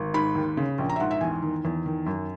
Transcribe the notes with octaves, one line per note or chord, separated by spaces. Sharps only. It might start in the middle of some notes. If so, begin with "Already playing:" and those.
Already playing: G#1
G#2 B5
D#2
C#3
A#1
A#5
E5
G#2 F#5
E5
E2 G#5
D#3
E2
D#3
F#2